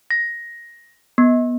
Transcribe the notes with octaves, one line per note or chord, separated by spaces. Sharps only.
A#6
B3